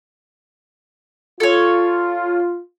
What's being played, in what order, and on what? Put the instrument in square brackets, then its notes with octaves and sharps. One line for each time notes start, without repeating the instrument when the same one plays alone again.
[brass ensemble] F4 [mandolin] A4 C#5